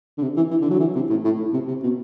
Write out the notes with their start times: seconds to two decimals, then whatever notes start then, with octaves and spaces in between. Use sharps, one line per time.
0.18 D3
0.22 C3
0.37 E3
0.51 E3
0.61 D3
0.70 F#3
0.80 E3
0.95 C3
1.10 A2
1.25 A2
1.53 C3
1.68 C3
1.83 B2